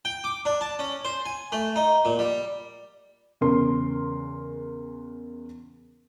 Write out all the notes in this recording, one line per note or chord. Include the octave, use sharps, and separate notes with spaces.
G5
D6
D4
A5
C#4
C5
G#5
A3
D#4
A#2
G3
E2 C#3 C#4 A#4 C6